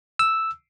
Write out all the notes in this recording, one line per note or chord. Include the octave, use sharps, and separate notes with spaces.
E6